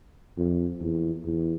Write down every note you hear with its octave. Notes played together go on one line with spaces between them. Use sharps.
F2
E2
E2